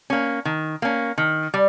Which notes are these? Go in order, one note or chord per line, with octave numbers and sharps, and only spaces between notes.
A#3 C#4
D#3
A#3 C#4
D#3
G3